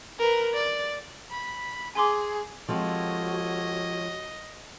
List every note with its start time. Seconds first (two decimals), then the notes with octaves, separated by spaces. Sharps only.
0.19 A#4 B4
0.54 D5
1.30 B5
1.95 G#4 G#5 C6 D6
2.68 F3 G#3 C4 F#4 G4 A4 C#5 D#5